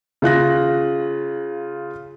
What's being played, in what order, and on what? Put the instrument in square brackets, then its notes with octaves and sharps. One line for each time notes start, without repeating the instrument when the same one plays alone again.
[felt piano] C#3 F4 F#6 A#6